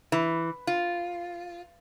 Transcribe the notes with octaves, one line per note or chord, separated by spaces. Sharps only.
E3
F4